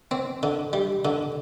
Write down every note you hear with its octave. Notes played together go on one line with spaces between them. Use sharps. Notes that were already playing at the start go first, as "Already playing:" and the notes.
C4
D3
G3
D3